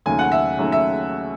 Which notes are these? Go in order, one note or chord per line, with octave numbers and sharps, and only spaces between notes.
D#2 C#3 F#3 A3 G#5
F#5
E5
D#2 C#3 F#3 A3
E5